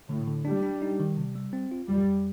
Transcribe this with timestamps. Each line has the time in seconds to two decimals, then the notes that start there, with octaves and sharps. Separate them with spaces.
0.09 A2 D3
0.27 D3
0.45 G3 D4
0.63 D4
0.82 D#4
1.00 D#3
1.17 C3
1.36 G3
1.53 C4
1.72 F4
1.89 F2 G3
2.07 F2